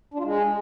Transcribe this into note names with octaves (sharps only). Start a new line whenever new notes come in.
D4
F4
G#3